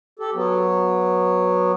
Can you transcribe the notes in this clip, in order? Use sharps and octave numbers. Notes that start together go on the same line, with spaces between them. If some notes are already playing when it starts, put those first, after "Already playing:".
G4 A4
F#3 B3